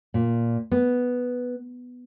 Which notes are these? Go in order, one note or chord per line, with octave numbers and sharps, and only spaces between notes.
A#2
B3